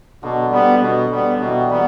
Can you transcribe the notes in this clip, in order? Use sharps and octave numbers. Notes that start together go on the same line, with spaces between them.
B2 D3 F#3
G3 B3
B2
G3
B3
F#3
B2 E3 G3
G3
F#3
E3 G3 B3